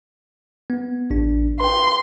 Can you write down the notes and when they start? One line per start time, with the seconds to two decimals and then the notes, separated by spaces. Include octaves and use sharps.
0.70 B3
1.10 A1 D4
1.60 B4 G5 C6